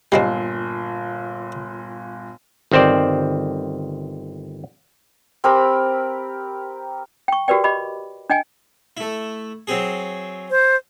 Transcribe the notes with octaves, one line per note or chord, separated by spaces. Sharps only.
G1 A#2 G3 G#3 C4 C7
G1 D#3 C4 C5 D5
C4 G4 A#4 B5
G5 C#6
F#4 G4 A#4 B4 D5 G5
G4 D#5 B5 D6
D4 D#5 G5 G#5
A3 E4
F#3 C4 G#4
C5